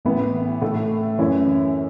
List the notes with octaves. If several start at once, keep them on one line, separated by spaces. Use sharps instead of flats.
A1 A2 E3 B3 E4
A2 A3 E4
F#2 E3 C#4 E4